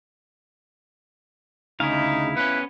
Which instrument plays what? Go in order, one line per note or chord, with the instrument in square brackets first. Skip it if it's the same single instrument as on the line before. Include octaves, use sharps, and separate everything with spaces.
[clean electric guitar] D2 C#3 G#4 [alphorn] D#4 [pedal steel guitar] E4 F5
[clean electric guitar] B3 C#4 [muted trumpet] B4